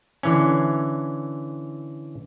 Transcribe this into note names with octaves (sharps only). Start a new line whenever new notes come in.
D3 E3 C#4